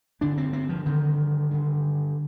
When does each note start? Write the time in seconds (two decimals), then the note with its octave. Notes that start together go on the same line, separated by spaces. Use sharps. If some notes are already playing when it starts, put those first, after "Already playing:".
0.21 G2 D3 D4
0.38 C4
0.53 C4
0.69 F3
0.86 G2 D3 D#3
1.51 G2 D3